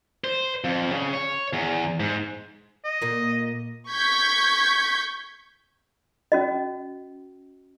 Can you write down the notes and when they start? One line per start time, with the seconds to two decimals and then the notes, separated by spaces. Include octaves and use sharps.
0.24 C5
0.64 F2
0.92 C#3
1.13 C#5
1.53 E2
2.00 G#2
2.85 D#5
3.02 A#2 A#3
3.91 C#6 G6 G#6 B6
6.32 C#4 F#4 D#5